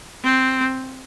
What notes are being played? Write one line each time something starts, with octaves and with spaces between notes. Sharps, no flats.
C4